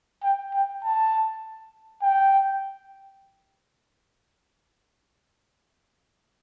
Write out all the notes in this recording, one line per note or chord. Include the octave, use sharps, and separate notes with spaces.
G5
G5
A5
G5